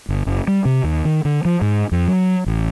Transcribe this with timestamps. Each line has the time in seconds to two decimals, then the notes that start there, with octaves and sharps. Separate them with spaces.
0.09 G1
0.27 F#1
0.47 G3
0.65 C3
0.84 D#2
1.05 D#3
1.25 D3
1.45 F3
1.61 G#2
1.92 F2
2.08 F#3
2.46 A1